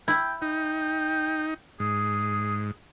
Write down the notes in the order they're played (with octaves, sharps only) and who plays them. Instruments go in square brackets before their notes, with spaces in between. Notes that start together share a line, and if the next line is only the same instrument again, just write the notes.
[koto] E4 [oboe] G5
[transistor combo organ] D#4 [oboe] G5
[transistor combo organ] G#2 [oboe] G#4